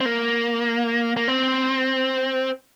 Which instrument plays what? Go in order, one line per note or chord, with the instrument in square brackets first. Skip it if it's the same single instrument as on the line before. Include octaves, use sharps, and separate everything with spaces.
[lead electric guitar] C4
A#3
A#3
C4